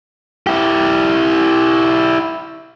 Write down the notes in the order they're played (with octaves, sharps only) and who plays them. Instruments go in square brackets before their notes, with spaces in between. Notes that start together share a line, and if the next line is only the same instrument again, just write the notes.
[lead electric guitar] E4 G4